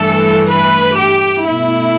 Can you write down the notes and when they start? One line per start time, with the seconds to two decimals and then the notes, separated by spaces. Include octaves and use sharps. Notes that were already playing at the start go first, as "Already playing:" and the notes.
Already playing: G2 E3 A3 A4
0.49 B4
0.97 G4
1.43 B2 A3 E4